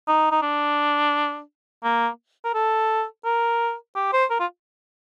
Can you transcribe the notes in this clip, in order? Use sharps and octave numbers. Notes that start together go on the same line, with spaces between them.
D#4
D#4
D4
A#3
A#4
A4
A#4
G4
C5
A#4
F4